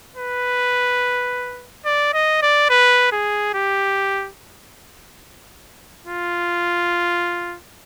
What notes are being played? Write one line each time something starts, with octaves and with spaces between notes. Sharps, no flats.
B4
D5
D#5
D5
B4
G#4
G4
F4